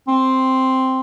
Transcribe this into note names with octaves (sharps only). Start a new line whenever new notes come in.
C4